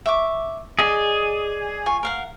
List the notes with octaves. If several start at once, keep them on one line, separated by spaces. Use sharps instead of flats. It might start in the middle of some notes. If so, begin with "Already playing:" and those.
E5 C#6 D6
G#4 D5 D#5 G#5
F4 G#5 C#6
A#4 F5 F#5